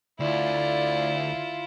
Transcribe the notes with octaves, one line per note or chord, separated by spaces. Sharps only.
D2 E4 F4 D5